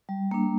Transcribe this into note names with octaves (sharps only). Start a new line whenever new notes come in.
G3
A#3 D4